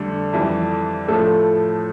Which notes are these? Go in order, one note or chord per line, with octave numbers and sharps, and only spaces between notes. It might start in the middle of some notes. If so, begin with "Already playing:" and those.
Already playing: F2 D3 G3 A3 A4
F2 E3 G3
A2 F3 A3 A4